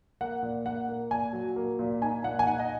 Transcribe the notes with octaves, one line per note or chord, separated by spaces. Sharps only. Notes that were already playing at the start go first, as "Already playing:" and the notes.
A#3 F#5
A#2
A#3 F#5
A#3
A#2 G#5
F#3
A#3
A#2
D#4 G#5
A#2 F#5
G#5
D#4 F#5
D#5